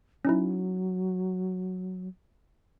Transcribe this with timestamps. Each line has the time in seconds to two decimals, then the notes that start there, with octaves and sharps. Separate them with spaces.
0.25 F#3 C#4 D#4 E4